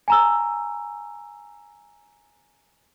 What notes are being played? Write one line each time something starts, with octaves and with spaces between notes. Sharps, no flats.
G#5 A#5 E6